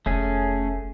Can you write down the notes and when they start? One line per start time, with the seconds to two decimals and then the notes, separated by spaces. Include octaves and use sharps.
0.06 F1 A3 C#4 G#4